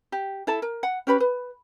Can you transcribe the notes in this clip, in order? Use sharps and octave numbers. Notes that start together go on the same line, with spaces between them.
G4
E4 A4 A5
A#4
F#5
C#4 G4 B4 B5
B4